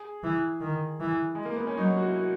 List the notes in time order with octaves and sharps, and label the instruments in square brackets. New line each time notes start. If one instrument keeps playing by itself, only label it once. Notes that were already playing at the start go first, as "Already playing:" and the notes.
Already playing: [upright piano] G#4
[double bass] E3
D#3
E3
[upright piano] G#3
A#3
B3
C#4
[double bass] F#3 [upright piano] D#4
[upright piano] F#4
E4
F#4